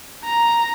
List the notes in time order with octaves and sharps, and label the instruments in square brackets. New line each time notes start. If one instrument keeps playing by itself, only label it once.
[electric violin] A#5